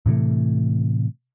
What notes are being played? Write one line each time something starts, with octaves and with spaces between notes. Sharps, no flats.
A2 C3 E3 A3